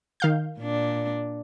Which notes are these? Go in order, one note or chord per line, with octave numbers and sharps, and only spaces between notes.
D#3 F5 G6
A#2 D4